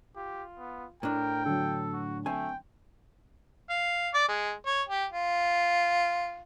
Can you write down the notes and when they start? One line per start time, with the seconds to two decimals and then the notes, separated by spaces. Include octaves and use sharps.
0.16 F4 G4
0.58 B3
1.03 A2 D4 A#4 G5
1.46 D3 F#3 A4
1.93 F#4
2.26 A3 C4 G5 G#5
3.70 F5
4.14 D5
4.28 G#3
4.66 C#5
4.89 G4
5.12 F4